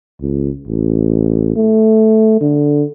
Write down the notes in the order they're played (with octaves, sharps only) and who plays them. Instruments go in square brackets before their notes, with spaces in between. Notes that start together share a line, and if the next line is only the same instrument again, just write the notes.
[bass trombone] C#2
A1
A3
D3